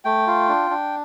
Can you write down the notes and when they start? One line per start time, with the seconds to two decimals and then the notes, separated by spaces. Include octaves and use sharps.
0.05 A3 G5
0.27 F4
0.49 D4
0.70 D4